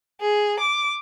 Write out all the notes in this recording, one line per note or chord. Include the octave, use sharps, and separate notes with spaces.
G#4
D6